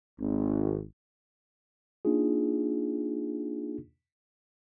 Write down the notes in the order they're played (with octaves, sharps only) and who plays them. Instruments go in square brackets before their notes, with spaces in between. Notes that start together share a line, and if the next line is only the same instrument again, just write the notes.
[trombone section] G#1
[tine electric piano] A#3 D4 D#4 F4 G#4